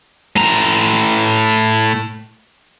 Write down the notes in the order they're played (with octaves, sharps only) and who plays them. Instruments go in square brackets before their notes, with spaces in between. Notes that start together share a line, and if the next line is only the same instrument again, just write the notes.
[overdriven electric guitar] A2 A#5